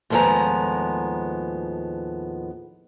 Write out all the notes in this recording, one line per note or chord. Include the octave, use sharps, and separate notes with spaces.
D#2 A2 F3 G#3 B3 A#5